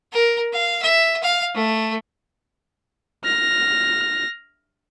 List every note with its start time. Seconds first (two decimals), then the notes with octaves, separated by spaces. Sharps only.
0.13 A#4
0.52 F5
0.82 E5
1.23 F5
1.55 A3
3.24 F6 A#6